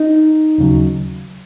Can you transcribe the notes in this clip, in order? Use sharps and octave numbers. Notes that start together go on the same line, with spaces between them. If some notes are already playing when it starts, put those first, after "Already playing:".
Already playing: D#4
D#2 C#3 F#3